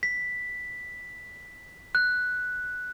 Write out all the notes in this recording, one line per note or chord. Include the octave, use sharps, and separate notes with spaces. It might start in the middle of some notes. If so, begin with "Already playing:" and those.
B6
F#6